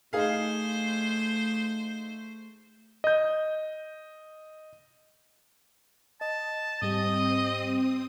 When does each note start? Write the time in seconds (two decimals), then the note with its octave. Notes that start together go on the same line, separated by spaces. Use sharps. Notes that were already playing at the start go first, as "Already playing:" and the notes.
0.13 A3 D#4 G#4 C5 F5
3.04 D#5 G6
6.21 D#5 A5
6.82 G#2 G3 C4 G4 D#5 D#6